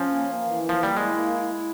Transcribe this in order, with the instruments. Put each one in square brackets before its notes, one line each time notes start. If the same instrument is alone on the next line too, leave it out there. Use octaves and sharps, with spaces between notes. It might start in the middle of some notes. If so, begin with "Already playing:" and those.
Already playing: [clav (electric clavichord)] F3 [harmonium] C#4
[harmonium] A#3
A#3
E3
A#3
[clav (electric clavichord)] F3
[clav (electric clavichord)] G3 [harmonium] A#3
[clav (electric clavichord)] G#3 [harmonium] E4
[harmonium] A#3
E4
E4